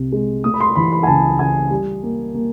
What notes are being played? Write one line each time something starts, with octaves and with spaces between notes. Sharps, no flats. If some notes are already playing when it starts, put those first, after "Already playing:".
Already playing: C2 C3
G#3
A3 D#6
B5
C6
E3 B5
B5
G#5
C#2 A5
C#3 G#5
G3
A#3
A#3